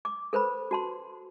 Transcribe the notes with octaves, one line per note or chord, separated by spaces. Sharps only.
D6
A4 B4 C5 B5
F#4 A5 C6